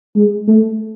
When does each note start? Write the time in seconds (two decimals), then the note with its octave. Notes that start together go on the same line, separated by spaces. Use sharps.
0.15 G#3
0.48 A3